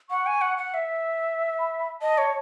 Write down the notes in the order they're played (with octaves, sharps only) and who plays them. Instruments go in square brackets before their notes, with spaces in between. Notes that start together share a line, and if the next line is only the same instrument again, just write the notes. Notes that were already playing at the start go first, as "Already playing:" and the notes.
[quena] F#5 [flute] C#6
[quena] G#5
F#5
F#5
E5
[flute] B5
B5
[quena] D#5 [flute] A5
[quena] C#5